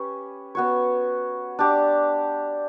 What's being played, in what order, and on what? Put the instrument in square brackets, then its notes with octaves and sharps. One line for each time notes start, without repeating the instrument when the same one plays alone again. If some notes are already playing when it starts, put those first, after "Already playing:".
Already playing: [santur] C#4 G4 B4
B3 F#4 C#5
D4 G4 D5